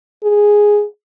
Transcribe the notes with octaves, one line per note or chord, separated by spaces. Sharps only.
G#4